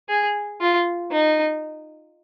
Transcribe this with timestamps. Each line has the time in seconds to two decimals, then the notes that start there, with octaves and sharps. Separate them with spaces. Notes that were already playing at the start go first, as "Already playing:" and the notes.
0.09 G#4
0.61 F4
1.11 D#4